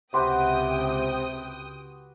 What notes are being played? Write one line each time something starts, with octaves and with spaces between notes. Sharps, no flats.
C#2 C3 F#4 G4 B4 G5 C6 D#6